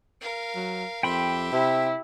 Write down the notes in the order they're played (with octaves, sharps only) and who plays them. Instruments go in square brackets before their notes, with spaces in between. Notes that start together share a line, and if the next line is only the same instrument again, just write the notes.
[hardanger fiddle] A#4 F5
[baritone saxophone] F#3
[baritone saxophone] F2 [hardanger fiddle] G4 E5 [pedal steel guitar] G5 B5 C6
[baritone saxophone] C3 [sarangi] E4